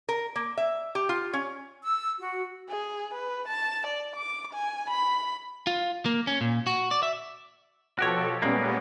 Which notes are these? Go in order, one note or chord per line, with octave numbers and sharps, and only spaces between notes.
A#4
A#3
E5
G4
F4
C#4
E6
F#4
G#4
B4
A5
D5
D6
G#5
B5
F4
A#3
C#4
A#2
F#4
D5
E5
B2 F3 F#4 G4 A4 C#5
A#2 G3 G#3 A#3 B3 C#4